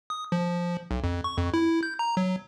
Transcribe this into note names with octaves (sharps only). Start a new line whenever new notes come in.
D#6
F3
B1
F2
C#6
F2
E4
G6
A#5
F#3